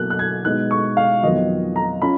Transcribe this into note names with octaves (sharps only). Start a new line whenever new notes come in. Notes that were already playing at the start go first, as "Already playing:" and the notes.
Already playing: B2 F#3 A#3 F#6
F#6
G#6
B2 G#3 B3 D#4 F#6
C#6
F5
F2 D#3 F#3 B3 F4 D#5
A#5
C#4 F4 B5